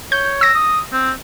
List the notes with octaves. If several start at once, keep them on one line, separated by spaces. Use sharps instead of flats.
C#5 G6
E6 A#6
D#6
C4